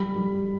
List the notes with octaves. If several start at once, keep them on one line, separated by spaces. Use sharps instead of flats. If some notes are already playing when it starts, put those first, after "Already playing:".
Already playing: G3 B5
G3